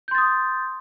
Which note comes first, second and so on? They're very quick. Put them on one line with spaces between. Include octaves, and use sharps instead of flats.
G6 C6 A6 D#6